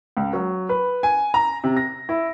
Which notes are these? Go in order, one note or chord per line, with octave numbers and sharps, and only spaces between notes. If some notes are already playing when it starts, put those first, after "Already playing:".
C#2
F#3
B4
G#5
A#5
C3
A#6
E4